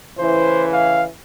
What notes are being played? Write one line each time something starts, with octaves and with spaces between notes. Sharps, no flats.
A2 C#3 E3 C5
F5